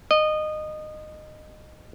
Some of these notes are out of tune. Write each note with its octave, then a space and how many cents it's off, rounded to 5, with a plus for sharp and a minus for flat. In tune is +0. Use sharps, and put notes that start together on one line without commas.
D#5 -20